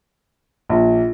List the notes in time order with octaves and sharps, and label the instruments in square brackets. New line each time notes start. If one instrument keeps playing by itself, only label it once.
[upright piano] A#1